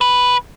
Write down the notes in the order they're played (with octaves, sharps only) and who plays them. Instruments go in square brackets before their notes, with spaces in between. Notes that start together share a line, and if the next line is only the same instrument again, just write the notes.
[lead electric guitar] B4